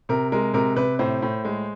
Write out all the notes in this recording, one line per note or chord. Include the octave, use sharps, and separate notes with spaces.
C3 A#4
G#3 A#4
C3 A#4
C3 B4
A2 C5
A2
G#3